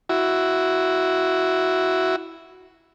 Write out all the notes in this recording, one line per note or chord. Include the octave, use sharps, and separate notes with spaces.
E4 F#4